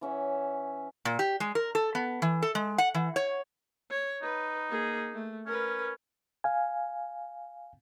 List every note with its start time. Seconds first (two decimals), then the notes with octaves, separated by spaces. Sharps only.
0.01 E3 C#4 E5 F#5
1.05 A#2
1.19 G4
1.40 G#3
1.55 A#4
1.75 A4
1.95 B3
2.22 E3
2.42 A4
2.55 G#3
2.78 F#5
2.95 E3
3.16 C#5
3.90 C#5
4.22 D#4 B4
4.69 A#3 G#4
5.14 A3
5.47 C#4 A#4 B4
6.44 F5 G#5